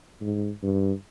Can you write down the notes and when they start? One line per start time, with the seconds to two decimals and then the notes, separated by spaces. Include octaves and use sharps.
0.21 G#2
0.63 G2